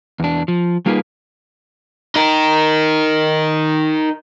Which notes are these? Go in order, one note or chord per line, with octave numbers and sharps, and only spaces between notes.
E2 D4
F3
G3 A#3 D#4 F4 G#4 B4
D#4 A#4